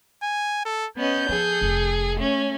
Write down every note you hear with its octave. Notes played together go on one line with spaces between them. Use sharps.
G#5
A4
B3 C#4 D#5 G6
F3 G#4 A4
F1
A3 C#4